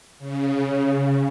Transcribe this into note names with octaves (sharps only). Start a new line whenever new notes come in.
C#3